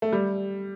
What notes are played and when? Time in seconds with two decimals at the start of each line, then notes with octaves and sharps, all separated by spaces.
0.02 A3
0.12 G3